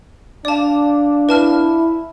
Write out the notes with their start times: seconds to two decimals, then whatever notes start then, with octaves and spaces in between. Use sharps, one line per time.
0.45 D4 D5 F5 A5 D6
1.29 E4 B4 A5 F6